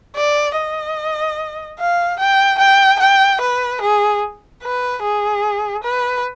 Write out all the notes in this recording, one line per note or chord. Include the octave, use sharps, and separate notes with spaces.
D5
D#5
F5
G5
G5
G5
B4
G#4
B4
G#4
B4